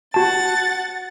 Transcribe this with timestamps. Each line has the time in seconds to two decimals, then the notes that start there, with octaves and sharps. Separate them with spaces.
0.14 F#4 F#5 A5 A6